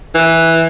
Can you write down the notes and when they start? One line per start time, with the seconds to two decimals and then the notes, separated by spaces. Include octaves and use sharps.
0.15 E3